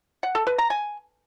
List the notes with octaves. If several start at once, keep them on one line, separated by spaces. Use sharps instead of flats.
F#5
A4
B4
A#5
G#5